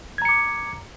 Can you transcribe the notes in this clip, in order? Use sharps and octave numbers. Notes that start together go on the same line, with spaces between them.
A#5 D6 G#6 C#7